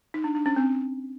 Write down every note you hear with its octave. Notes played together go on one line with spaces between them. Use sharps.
D#4
D4
D4
C#4
C4